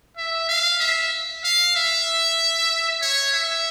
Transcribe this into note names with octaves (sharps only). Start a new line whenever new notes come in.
E5
F5
E5
F5
E5
C#5
E5